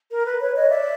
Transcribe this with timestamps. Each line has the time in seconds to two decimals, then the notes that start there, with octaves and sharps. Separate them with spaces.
0.12 A#4
0.27 B4
0.41 B4 C#5
0.56 C#5 D#5
0.71 D5 E5